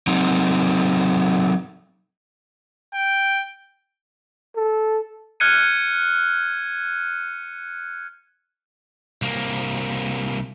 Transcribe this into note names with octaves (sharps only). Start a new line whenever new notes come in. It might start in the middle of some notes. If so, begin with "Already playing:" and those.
F#3 C4 D#4
G5
A4
F6 F#6 G#6 C#7 D#7
C2 A#3